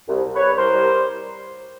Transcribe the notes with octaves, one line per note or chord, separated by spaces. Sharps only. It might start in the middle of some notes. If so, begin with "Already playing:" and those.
C2
C2
B4 C#5
G3
C2 A#4 C5
G3